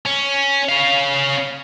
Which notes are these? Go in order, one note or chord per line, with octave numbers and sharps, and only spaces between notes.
C#4
C#4 F5